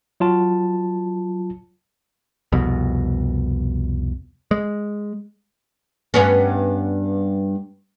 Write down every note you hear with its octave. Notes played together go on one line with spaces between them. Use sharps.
F#3 F4 A5
C2 F2 B2
G#3
G2 B3 C#4